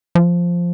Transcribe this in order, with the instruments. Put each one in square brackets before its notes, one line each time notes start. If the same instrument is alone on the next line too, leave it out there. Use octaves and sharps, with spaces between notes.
[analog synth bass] F3